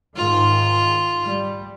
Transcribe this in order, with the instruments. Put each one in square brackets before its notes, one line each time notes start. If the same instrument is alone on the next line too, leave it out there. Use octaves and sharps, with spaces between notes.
[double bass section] G#2 D#3 [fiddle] F4
[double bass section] G3